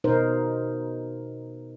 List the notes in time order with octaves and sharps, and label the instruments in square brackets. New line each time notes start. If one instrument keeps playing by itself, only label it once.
[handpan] B2 D#4 A#4 C5